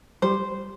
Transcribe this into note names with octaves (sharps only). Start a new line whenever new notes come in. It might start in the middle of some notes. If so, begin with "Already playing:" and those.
G3 C5